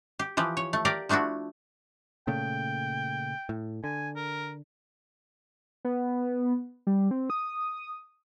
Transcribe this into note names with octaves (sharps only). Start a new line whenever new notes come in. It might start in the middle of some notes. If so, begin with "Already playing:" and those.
G4
E3 F3 G4
C#5
A3
G4 A#4 D5 F5
F3 A3 D4 E4 F#4
A#2 C#3 A3 G5
A2
D3 G#5
A#4
B3
G3
C4
D#6